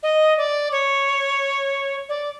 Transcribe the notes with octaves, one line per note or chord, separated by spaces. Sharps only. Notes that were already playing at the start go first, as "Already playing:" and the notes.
D#5
D5
C#5
D5